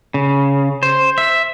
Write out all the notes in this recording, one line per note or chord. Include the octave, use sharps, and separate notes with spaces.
C#3
C5
E5